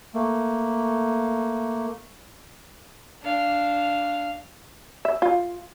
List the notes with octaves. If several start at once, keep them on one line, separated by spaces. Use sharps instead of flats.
A3 A#3
D4 F5
E5
F4